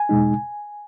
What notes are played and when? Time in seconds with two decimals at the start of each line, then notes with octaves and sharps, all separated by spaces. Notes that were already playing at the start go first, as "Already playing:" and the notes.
Already playing: G#5
0.09 E2 B2 G#3 D#4